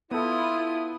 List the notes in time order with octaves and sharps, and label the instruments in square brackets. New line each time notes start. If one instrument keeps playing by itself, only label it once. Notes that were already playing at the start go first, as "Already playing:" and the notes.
[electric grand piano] B3 A4 [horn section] E4 [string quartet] F4 D#6